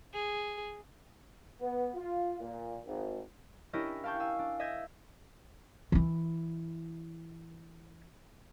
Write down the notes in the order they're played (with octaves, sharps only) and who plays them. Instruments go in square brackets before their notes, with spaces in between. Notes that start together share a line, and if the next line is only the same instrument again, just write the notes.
[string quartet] G#4
[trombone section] B3
F4
A#2
G#1
[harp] C#4 D4 E4 G4 A#4 D#5
F5 G5 A5 C#6 G6
F5 G#5 E6
D4
D#5 E5 D#6 E6 G6 G#6
[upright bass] E3 E4